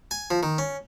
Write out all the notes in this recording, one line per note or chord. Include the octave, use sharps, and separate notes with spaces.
G#5
F3
D#3
C#4